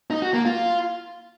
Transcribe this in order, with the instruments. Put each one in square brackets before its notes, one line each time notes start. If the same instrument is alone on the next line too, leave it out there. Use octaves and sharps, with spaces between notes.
[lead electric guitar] D#4
F#4
A#3
F4